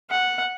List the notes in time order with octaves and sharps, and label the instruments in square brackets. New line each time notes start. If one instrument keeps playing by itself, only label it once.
[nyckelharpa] F#5